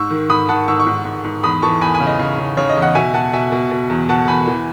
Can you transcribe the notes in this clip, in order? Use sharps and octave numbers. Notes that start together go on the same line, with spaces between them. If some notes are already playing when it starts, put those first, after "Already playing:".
Already playing: G#2 C#6 E6
D#3
G#2 B5 D#6
D#3 F#5 A5
G#2 C#6 E6
C#6 E6
G#2
G#2
G#2
E2 B5 D#6
E3 A5 C#6
E2 G#5 B5
G#5 B5
C#3
D#5
C#3
C#3
C#3 C#5
D#5
E2
D#5 F#5
B2 E5 G#5
B2 F#5 A5
B2 E5 G#5
B2
B2
E2
B2 F#5 A5
E2 G#5 B5
E3